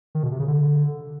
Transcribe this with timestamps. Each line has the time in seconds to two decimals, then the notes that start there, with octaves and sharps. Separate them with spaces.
0.15 D#3
0.23 B2
0.31 C3
0.40 C#3
0.48 D3